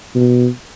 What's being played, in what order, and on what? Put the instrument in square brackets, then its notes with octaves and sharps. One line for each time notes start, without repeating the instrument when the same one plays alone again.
[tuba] B2